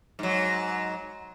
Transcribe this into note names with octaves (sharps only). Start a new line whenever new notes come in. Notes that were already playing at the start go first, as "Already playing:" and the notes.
G#2 F#3